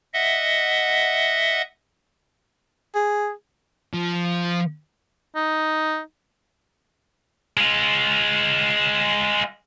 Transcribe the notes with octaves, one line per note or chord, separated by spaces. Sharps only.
D#5 E5 F#5
G#4
F3
D#4
G#3 F4